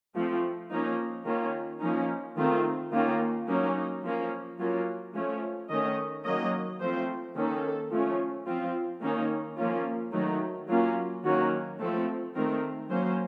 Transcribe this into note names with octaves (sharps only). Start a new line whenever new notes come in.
F3 A3 C4
F3 A#3 C#4 D#4
D#3 A#3 C#4 F4
F3 A#3 C#4 D#4
D#3 A3 C4 F4
D#3 A#3 C#4 F4
F#3 A#3 C#4 D#4
F3 A#3 C#4
F#3 A#3 C#4 F4
F3 A3 C#4
D#3 A3 C#4 D#5
D#3 F#3 A#3 C#4 D#5
F3 A3 C4 C5
D#3 A#3 C#4 A4
F3 A3 C#4
F3 C4 F4
D#3 A#3 C#4 D#4
F3 A#3 C#4 F4
D#3 F#3 A3 D#4
F#3 A#3 C#4 F4
D#3 F#3 A#3 C#4 F#4
F3 A3 C4 A4
D#3 A3 C4 A#4
F#3 A#3 C#4 C5